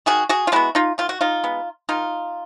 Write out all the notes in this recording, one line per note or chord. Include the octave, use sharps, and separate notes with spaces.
D#3 F#4 G#4
F#4 G#4
F4
G#3 B3 E4 F#4
D#4 F4
D#3 F4
F#4
D#4 F4
G#3 B3
D#3 D#4 F4